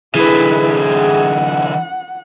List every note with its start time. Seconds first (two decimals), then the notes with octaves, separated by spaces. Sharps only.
0.15 D3 E3 E4 G#4 B4
0.92 F#5